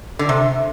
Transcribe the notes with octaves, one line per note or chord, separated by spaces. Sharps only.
D3
C3